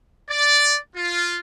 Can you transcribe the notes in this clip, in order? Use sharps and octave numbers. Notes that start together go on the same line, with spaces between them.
D5
F4